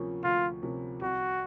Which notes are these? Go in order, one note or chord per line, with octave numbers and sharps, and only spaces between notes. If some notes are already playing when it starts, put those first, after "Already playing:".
Already playing: D2 C3 F3 A#3 C#4
D2 F4
C3 F3 A#3 C#4
C2 F#4